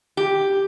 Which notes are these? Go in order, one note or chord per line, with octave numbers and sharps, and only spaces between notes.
G4